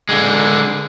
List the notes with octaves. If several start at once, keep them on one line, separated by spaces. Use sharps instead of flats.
D3 G#3